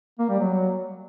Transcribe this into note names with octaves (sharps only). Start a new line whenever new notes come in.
A#3
G3
F#3